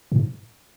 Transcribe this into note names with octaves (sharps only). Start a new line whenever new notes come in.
G#2